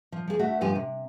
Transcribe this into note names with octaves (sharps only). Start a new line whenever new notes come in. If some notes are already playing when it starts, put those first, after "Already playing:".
F3
F3 G#4
D2 A3 F#4 E5
D2 G2 F3 G4 G#5
C3